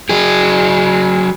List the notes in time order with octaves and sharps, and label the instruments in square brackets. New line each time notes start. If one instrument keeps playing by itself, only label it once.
[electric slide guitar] F#3 G#4